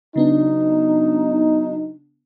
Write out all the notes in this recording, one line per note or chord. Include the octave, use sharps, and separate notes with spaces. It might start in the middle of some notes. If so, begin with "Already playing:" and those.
C#3 F#3 B3 D4 D#4